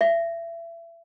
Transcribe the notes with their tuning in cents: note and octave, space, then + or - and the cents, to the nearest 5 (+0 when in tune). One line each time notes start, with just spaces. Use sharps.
E5 +30